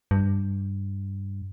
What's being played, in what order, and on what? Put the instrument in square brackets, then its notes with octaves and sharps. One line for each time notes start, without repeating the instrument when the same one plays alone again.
[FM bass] G2